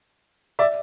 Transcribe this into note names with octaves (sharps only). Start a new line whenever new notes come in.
D5 E5